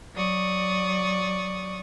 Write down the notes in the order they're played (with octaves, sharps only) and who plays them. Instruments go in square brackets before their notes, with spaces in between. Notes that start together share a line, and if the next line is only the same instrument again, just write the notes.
[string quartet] F#3 D5 C#6 D#6